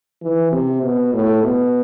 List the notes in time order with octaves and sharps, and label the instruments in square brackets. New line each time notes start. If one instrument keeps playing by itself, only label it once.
[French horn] E3
C3
B2
A2
B2